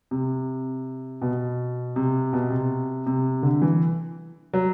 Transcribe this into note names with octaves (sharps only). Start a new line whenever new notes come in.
C3
B2
C3
B2
C3
C3
D3
E3
F#3